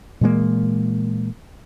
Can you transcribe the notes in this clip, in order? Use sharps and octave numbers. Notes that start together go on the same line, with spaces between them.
A#2 E3 G#3 A#3